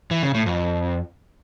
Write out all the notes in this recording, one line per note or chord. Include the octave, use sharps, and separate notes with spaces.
E3
C#3
A2
F2